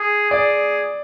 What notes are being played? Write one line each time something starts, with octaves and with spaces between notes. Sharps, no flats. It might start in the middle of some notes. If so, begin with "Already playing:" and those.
Already playing: G#4
G#4 D5